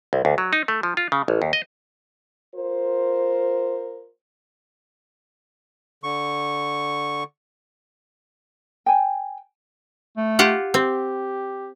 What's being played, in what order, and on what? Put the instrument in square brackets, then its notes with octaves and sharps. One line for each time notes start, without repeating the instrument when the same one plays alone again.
[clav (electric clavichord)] C2
D2
F#3
D#4
A3
F3
F4
C#3
A1
D#2
D#5
[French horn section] F4 A#4 C5
[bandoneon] D3 C#6
[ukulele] G5 G#5
[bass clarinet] A3
[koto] F4 G4 F#5
[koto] C4 [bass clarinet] G4